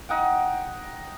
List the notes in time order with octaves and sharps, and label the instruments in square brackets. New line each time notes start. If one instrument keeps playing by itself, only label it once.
[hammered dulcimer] D#4 F#5 G5